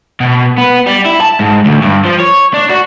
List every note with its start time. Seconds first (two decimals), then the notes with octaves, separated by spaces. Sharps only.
0.20 B2
0.58 B3
0.86 G3
1.05 E4
1.21 A5
1.39 G#2
1.65 D2
1.82 G2
2.05 F3
2.20 C#5
2.54 D4
2.69 F#4